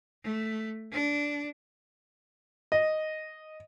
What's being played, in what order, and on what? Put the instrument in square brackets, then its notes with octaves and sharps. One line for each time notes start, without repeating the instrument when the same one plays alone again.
[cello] A3
D4
[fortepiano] D#5